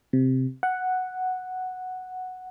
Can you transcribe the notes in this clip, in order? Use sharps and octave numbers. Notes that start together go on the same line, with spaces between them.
C3
F#5